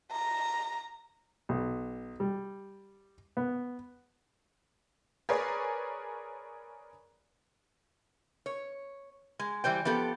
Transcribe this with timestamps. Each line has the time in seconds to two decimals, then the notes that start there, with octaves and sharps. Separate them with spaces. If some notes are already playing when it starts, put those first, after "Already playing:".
0.11 A#5
1.49 B1
2.20 G3
3.37 B3
5.29 G#4 A#4 B4 C#5 D5
8.46 C#5
9.39 G#3
9.64 E3 G3 C5 G5
9.85 F3 B3 G4 A4